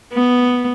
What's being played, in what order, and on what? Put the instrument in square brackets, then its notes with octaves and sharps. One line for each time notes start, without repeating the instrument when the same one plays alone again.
[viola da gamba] B3